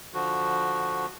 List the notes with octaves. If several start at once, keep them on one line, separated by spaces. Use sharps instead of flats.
D3 F3 F#4